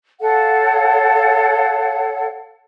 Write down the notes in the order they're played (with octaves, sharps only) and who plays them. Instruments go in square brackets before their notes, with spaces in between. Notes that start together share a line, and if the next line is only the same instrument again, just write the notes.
[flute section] A4 C#5 F5 F#5